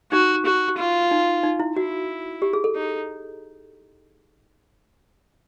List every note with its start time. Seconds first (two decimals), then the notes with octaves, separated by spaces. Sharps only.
0.12 D#4 F#4
0.46 F#4
0.78 F4
1.11 D#4
1.43 D#4
1.60 E4
1.77 E4 F#4
2.42 G4
2.53 G#4
2.64 A4
2.75 D#4